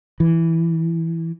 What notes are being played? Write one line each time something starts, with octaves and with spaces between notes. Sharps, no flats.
E3